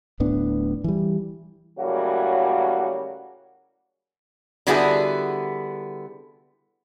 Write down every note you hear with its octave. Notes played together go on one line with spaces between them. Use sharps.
D1 A2 B3 D4
E3 G3
A2 C#3 F#3 G3 A#3 F#4
D3 G3 B3 E4 F#4 G#4